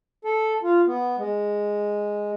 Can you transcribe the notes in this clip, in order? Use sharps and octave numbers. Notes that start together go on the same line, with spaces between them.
A4
F4
B3
G#3